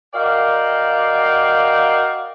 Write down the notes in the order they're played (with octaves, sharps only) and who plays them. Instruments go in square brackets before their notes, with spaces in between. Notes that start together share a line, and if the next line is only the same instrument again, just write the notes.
[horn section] F#4 A#4 D5 D#5 F5 G5